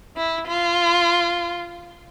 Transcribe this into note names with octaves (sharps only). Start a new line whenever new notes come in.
E4
F4